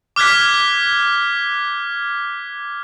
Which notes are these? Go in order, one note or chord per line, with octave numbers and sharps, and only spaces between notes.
D6 F6 F#6 G#6 B6